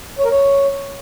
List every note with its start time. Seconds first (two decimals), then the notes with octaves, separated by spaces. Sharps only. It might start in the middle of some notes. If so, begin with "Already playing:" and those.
0.19 C#5
0.25 A#4
0.31 C#5